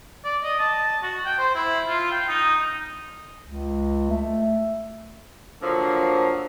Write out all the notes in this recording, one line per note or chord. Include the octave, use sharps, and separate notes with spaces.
D5
D#5
A5
F#4
G5
C5
E4
F4
G5
D#4
C#2
A3
D3 F3 F#3 A#3